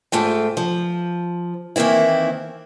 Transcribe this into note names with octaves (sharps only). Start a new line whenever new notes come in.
G#2 A3 F4 G5
F3
D#3 E3 A#3 C4 E4